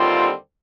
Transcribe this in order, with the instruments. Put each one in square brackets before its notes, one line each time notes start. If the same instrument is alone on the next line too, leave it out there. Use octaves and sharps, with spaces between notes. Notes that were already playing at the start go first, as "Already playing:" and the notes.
Already playing: [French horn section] D#2 D3 G3 C4 F4